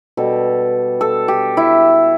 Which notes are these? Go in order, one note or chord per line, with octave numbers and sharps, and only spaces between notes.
B2 G3 A4
A4
G4
E4